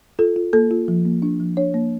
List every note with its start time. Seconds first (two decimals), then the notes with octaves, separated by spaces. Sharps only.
0.19 F4 A4
0.36 F4
0.53 A#3 A4
0.71 F4
0.88 F3
1.06 A#3
1.22 D4
1.40 F3
1.57 D4 C#5
1.74 A#3